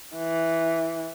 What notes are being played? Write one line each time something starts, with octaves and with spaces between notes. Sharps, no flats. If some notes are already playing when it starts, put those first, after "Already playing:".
E3